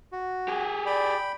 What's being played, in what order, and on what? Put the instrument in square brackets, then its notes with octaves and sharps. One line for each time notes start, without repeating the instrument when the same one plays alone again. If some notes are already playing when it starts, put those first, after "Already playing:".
[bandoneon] F#4
[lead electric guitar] G4 G#4
[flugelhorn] D5 [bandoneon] G5 B5